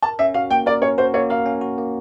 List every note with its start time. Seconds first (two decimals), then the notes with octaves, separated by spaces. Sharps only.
0.02 A#4 A5
0.19 C#4 E5
0.34 F#4 F5
0.50 A#3 G5
0.66 A#4 D5
0.82 C#4 C#5
0.98 F#4 C5
1.14 A#3 C#5
1.30 A#4 F5
1.46 C#4
1.61 F#4
1.78 A#3